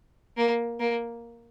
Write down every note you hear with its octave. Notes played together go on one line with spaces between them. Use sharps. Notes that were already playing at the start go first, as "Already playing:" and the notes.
A#3
A#3